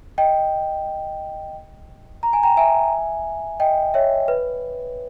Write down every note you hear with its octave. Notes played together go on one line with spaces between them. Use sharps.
D#5 G5
A#5
G#5
G5 A#5
E5 G#5
D#5 G5
C#5 E5
B4